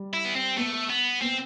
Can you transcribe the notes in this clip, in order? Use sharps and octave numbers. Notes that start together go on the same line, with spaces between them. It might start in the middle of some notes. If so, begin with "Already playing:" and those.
Already playing: G3
E4
B3
C4
A3 B3
B3
B3 C4